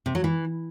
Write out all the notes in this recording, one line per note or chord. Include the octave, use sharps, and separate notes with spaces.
C3
F#3
E3